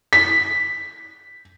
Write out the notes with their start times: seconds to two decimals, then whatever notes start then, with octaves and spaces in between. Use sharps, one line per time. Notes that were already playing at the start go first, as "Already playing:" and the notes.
0.13 B6